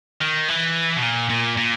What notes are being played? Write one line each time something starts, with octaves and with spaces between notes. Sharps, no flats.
D#3
E3
B2
A#2
A#2
A#2